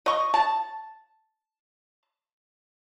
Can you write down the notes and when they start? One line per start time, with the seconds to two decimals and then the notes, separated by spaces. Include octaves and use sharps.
0.06 D#5 C#6
0.34 A5